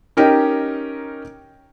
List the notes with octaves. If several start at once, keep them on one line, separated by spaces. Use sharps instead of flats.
C#4 D#4 G4 A#4 D#5 G5